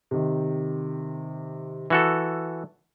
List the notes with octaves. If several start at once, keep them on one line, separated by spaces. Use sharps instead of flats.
C3 D#3
E3 F#4 A4